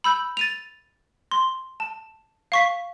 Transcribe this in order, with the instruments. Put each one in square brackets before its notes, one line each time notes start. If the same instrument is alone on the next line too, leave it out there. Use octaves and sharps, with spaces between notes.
[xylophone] B5 E6 G6
A6 D#7 F7
C6
A5
F5 C#6 B6